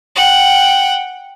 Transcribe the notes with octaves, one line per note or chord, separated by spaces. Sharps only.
F#5 G5